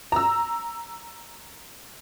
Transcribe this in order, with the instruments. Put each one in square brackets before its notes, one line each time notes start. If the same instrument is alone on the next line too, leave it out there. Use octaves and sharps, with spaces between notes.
[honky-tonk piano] A#5 E6